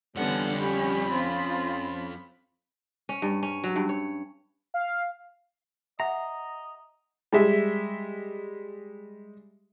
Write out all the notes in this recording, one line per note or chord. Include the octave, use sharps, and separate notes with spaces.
F2 D3 E3 G3 B3 C#4 F#5
C#4 G4 B5
F3 C4 C#4 F4
C#4
G2
C#4
F#3
G2
C#5
F5
G4 D#5 E5 F#5 A#5
G3 G#3 E5